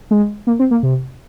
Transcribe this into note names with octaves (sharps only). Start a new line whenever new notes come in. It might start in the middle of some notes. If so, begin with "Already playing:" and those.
G#3
A#3
C4
A#3
C3